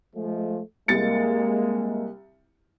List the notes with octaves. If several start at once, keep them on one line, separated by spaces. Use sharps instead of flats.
F3 G#3 A3
C2 G#3 A#3 A6 C#7